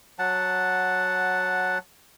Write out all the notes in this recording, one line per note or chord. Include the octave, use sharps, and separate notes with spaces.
F#3 F#5 A5